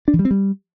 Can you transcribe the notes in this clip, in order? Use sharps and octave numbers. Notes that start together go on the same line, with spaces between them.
D4
E3
G3
C4
G3